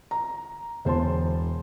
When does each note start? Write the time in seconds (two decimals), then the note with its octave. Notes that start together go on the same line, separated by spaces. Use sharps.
0.11 A#5
0.85 E1 C5 A5 C6